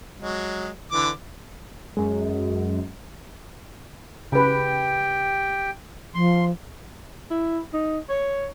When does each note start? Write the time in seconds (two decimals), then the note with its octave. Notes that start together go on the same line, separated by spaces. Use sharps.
0.20 F#3 G#3
0.92 D3 E3 D6
1.97 F#2 G#3
4.32 C#3 G4 B4 G5
6.14 F3 C6
7.30 E4
7.73 D#4
8.09 C#5